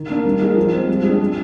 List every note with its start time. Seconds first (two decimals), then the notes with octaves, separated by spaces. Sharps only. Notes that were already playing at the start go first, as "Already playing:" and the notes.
Already playing: D#3
0.09 A#3 D4
0.25 G3
0.41 A#3 D#4 G#4
0.56 F3
0.73 G#3 C4
0.88 G3
1.04 G#4
1.09 D4
1.20 G#3